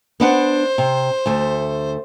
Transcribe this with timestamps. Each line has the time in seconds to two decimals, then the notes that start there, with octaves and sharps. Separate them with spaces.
0.20 B3 D4 C5 F#5
0.78 C3
1.26 D2 A3